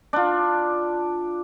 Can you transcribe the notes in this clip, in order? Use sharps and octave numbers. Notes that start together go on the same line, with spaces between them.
D4 F4